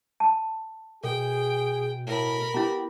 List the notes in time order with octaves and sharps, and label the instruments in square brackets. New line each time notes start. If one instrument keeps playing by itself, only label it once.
[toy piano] A5
[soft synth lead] B2 [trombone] G#4 [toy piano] A4 [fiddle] G5
[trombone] A2 [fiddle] A#4 B5
[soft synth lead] B3 [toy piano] E4 A#5 [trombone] G4